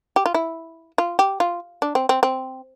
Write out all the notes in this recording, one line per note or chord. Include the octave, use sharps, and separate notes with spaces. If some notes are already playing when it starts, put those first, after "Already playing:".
G4
F4
E4
F4
G4
F4
D4
C4
C4
C4